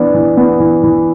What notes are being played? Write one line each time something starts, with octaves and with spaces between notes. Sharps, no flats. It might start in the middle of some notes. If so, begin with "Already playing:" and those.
Already playing: E3 B3 D4
E3
B3
E3
E3